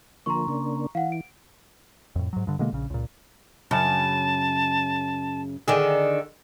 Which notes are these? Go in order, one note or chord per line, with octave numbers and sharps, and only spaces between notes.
D3 F3 A#3 A#5 C6 C#6
C#3 A#3 D4
E3 F5 F#5
D7
F2 A2
G#2 F#3
G2 D3
B2 D3 G#3 A#3
A#1 C#3
C#2 A#2
F#2 C#3 A5
D3 D#3 G#4